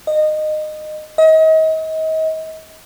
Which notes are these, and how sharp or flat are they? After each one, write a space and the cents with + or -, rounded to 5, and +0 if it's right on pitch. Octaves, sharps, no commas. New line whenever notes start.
D#5 -20
D#5 +35